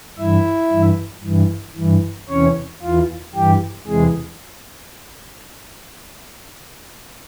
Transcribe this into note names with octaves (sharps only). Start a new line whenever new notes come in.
G2 E3 E4 E5
G2 E3
G2 E3
G2 E3
E2 C3 E3 C#4 C#5
E2 E3 F4
G2 E3 G4
E2 C3 E3 G#3 G#4